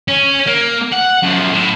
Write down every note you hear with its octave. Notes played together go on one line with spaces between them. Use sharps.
C#4
A#3
F#5
F#2 F3
A2